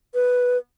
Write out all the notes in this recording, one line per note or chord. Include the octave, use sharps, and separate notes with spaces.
B4